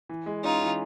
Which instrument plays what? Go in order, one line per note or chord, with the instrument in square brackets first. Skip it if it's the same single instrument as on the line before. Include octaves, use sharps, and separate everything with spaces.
[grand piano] E3
G#3
[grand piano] C#4 [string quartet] D#4 F4
[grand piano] E3